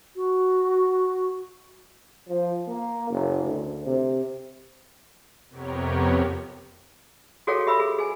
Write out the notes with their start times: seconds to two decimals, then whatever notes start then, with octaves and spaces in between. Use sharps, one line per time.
0.16 F#4
2.29 F3
2.68 A#3
3.10 F#1
3.44 D2
3.86 C3
5.49 F2 C3 B3 G4 A#4 C#5
7.47 F#4 G#4 A4 C#5 F5 G5
7.67 G4 E5 B5 E6
7.80 G#4
7.98 G#4 G#5